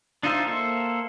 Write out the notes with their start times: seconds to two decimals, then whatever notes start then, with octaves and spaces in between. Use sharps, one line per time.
0.23 D4 D#4 F4 C5 E5
0.46 A#3 A4 C5 E5